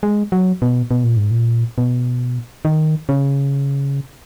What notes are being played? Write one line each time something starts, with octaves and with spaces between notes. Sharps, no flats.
G#3
F#3
B2
B2
A#2
G#2
A#2
B2
D#3
C#3